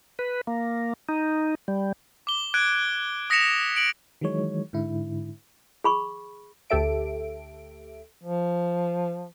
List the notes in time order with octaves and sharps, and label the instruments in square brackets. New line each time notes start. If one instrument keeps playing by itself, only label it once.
[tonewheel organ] B4
A#3
D#4
G3
[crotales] D6 G7
F#6 G#6 D7
D#6 A#6 B6 C#7 E7 F7
D7 F#7
[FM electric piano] D#3 E3 F#3 G#3 C#5
G#2 D3 E4
[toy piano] G#4 B5 C#6
[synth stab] D2 G4 A4 E5 D7
[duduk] F3